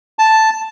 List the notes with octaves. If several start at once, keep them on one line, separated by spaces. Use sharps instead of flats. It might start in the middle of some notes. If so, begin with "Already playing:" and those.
A5